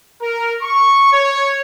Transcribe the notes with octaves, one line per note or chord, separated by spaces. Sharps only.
A#4
C#6
C#5